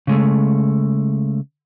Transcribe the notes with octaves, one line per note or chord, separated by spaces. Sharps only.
C#3 G#3 A3